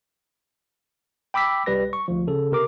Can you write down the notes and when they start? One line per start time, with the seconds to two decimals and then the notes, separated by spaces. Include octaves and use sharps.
1.34 G5 B5 D6 E6 B6
1.66 C2 G3 B4 A#6
1.93 C#6
2.08 G#1 D2 F3
2.27 C#3 A4
2.52 C3 A#4 D6